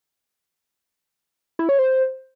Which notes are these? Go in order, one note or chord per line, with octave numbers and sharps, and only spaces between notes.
E4
C#5
C5